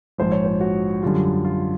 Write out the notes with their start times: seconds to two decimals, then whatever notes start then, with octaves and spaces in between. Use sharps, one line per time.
0.18 A#1 G#2 F3 C5
0.32 C#5
0.45 C5
0.60 F#4
1.03 F#2 D3 G3 F4
1.45 F4